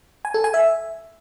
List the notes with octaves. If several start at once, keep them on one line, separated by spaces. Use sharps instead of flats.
G#5
A4
G#5
E5